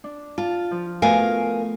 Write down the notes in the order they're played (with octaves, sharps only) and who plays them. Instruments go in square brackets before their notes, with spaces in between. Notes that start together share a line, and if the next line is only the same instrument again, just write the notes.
[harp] D4
[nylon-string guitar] F4 [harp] A5
[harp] F3
[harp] A3 B3 F#4 [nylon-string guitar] A#4 F5 G#5